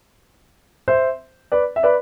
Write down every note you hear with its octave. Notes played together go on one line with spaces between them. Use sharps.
C5 E5
B4 D5
E5
B4 D5